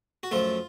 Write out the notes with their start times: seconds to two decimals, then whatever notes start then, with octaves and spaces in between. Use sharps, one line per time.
0.23 F#4
0.31 F#2 F3 A3 F4